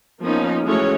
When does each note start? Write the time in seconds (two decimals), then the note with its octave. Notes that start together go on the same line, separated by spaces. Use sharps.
0.22 F3 A#3 B3 C#4 D#4
0.65 E3 G#3 A3 C#4 F#4 C#5